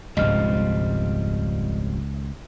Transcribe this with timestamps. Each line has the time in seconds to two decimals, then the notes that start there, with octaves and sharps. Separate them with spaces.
0.17 E1 C#2 G#2 F3 G3 C4 D#5 F6